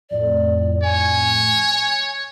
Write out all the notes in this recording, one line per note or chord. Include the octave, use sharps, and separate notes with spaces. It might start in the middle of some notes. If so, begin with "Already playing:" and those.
F2 A2 D5
C#5 G#5